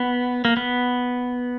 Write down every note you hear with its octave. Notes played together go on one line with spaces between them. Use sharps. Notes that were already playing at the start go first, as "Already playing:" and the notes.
Already playing: B3
A#3
B3